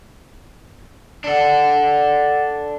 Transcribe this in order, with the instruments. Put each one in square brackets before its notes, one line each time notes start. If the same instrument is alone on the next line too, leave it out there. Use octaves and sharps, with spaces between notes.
[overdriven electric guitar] D4 A4 [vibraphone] D5 F#5